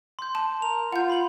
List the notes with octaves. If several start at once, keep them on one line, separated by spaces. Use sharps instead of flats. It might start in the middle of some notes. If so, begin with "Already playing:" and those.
C6 G6
A5
A#4 F7
F4 F#5 G6
B5 C6 F#7